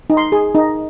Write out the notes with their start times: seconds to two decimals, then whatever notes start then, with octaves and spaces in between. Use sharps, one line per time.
0.10 D#4
0.17 C6
0.32 G#4
0.55 D#4